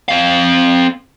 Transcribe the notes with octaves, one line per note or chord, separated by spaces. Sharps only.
C4 F5